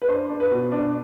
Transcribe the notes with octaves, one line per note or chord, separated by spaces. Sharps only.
B4
D4 C5
D4
B4
B2
D4